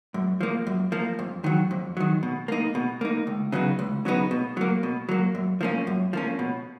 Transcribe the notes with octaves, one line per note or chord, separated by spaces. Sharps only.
F#2
F3 A#3
F#2
F3 A#3
F2
D#3 F#3
F2
D#3 F#3
B2
A#3 D#4
B2
A#3 D#4
C#2
C#3 F#3 B3 D#4
C#2
C#3 F#3 B3 D#4
B2
F#3 A#3
B2
F#3 A#3
F#2
F3 A#3 C#4
F#2
F3 A#3 C#4
B2